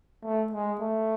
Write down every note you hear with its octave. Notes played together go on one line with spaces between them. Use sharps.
A3
G#3
A3